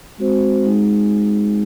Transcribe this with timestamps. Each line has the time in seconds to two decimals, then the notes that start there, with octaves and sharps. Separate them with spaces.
0.18 G#3 C4 F#4 C5
0.64 G#3 D#4 G#4